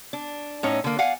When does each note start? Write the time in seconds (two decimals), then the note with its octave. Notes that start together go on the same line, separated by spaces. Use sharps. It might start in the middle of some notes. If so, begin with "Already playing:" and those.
0.13 D4
0.63 A2 C#4 D#4
0.84 D3 A#3
0.98 D5 F5 F#5 G#5